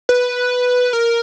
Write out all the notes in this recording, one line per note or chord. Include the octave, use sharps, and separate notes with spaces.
B4
A#4